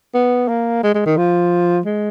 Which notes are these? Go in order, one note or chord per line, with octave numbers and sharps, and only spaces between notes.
B3
A#3
G#3
G#3
D#3
F3
G#3